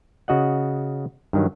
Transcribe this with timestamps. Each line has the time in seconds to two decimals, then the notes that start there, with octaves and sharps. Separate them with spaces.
0.28 C#3 F#4 D#5 F#5
1.33 G2 D#3 F#3